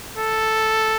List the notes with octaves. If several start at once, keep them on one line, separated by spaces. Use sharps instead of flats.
A4